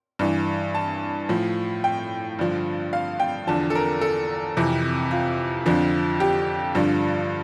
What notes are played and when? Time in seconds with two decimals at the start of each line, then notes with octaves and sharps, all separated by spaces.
0.19 G2 E3
0.75 A5
1.29 A2 F3
1.84 G5
2.39 G2 D3 F3
2.93 F5
3.20 G5
3.47 E2 D3 F3 A5
3.70 A4
3.75 A#4
4.01 A4
4.57 F2 C3 E3
5.11 F4
5.66 F2 D3 F3
6.20 G4
6.75 G2 D3 F3